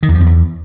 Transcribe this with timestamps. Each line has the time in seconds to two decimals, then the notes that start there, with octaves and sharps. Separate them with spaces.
0.03 D#3
0.09 E2
0.15 F3
0.20 F2
0.26 E2